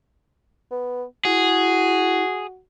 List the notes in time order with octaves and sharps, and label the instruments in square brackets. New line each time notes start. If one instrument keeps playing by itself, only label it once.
[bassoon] B3
[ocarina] E4 [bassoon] F#4 [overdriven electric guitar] G#4